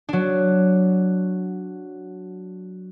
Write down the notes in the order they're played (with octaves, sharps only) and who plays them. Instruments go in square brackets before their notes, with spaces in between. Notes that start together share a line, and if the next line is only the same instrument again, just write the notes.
[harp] F#3 D4